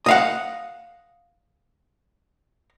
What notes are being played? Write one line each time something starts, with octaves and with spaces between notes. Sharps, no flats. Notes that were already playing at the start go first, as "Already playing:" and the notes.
D#5 F5 F#5